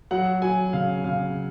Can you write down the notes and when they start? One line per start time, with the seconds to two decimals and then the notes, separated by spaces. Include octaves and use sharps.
0.11 F#3 F#5
0.42 F#3 G#5
0.73 C#3 F5
1.04 C#3 F5